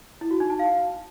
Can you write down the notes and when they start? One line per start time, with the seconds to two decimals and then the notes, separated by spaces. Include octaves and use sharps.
0.21 E4
0.31 F#4
0.40 D#4
0.50 A5
0.59 F5